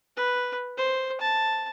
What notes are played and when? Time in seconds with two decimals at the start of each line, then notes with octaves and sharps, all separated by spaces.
0.17 B4
0.77 C5
1.20 A5